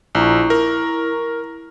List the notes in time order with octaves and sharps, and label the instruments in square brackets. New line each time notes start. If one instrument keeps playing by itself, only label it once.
[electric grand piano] A#1 [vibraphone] E4 A#5 C#6
[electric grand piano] A#4